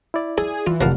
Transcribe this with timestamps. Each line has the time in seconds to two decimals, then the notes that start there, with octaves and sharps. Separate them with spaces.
0.14 E4 D5
0.38 G#4 A4
0.67 E3 F4
0.81 F1 F3 A#3 F#5 A5 F6